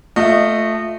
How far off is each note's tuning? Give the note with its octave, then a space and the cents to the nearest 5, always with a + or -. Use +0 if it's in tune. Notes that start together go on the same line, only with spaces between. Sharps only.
A3 +0 F4 +10 D#5 -20